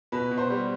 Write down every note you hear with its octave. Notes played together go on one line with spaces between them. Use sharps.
B2 B4
B2
C5
G3